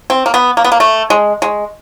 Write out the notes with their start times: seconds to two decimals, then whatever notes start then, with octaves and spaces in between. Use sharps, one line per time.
0.10 C4
0.26 A#3
0.34 B3
0.57 A#3
0.64 B3
0.72 A#3
0.80 A3
1.10 G#3
1.42 G#3